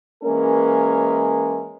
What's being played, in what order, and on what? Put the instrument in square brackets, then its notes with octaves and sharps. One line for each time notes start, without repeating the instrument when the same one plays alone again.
[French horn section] E3 G#3 A#3 C#4 A#4